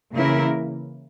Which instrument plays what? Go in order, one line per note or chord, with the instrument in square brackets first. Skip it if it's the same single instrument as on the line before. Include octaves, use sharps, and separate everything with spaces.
[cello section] C#3 E3 A#3 E4 A#4